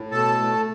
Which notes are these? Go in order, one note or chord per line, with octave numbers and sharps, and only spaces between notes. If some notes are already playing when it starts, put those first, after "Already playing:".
Already playing: A2
B2 A4 A5
A3